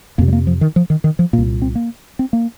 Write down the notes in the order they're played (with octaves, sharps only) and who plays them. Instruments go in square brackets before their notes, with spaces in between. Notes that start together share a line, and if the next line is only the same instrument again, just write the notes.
[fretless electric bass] F2 C3 A#3
G3
A#3
F3
D#3
F3
D#3
D#3
F3
A#2 A#3
C2
C4
A#3
C4
A#3